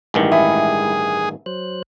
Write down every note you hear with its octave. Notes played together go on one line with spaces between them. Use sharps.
A1 G2 D#3 G#3 E4
G#4 E5 B5
F#3 C5 F#6